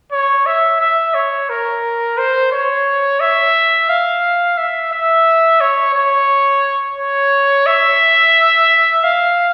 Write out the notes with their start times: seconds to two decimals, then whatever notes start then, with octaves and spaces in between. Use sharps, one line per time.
0.12 C#5
0.46 E5
0.80 E5
1.14 C#5
1.49 A#4
2.18 C5
2.52 C#5
3.20 E5
3.89 F5
4.58 E5
4.92 E5
5.60 C#5
5.94 C#5
6.98 C#5
7.66 E5
9.03 F5